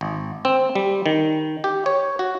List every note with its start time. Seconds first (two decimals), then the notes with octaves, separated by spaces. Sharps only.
0.01 G#1
0.45 C4
0.75 G3
1.06 D#3
1.64 G4
1.86 C#5
2.19 F#4